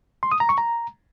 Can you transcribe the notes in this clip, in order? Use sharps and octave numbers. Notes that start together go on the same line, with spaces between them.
C6
D#6
A#5
C#6
A#5